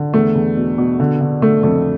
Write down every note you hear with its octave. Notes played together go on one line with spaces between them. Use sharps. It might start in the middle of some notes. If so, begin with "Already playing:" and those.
Already playing: D3
E2 A3
E2
B2
B2
D3
D3
D3 A3
F2 A3